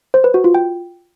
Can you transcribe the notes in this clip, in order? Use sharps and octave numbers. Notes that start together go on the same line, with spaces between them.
C5
B4
F#4
F4
G5